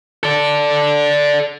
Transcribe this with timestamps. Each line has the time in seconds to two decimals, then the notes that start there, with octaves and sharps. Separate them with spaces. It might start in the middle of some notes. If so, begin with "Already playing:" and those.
0.23 A4 D5